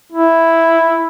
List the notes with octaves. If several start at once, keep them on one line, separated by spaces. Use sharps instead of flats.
E4